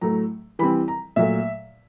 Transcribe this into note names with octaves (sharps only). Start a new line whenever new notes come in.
A2 F#3 A3 A#5
E3 G3 C4 B5
A#5
A#2 F#3 A3 E5